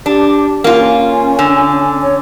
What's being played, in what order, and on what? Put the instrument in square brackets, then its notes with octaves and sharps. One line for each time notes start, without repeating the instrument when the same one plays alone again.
[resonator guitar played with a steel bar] D4 [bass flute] G4
[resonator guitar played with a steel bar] A#3 F4 [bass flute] C#4
[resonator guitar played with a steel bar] D3
[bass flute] C#5